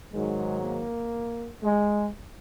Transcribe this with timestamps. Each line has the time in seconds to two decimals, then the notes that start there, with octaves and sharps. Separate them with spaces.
0.12 G#2 D#3 F#3 G#3
0.62 A#3
1.63 G#3